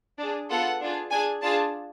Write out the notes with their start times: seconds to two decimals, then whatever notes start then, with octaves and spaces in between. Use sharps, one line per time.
0.19 D4 G#4
0.49 B3 F4 A4 F#5
0.80 D4 F4 G#4
1.10 D4 G#4 G#5
1.42 D4 F4 G#4 A5